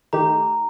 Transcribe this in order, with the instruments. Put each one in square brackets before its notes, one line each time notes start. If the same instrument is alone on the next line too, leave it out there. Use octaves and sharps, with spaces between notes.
[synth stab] D#3 A3 D#4 G4 [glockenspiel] A#5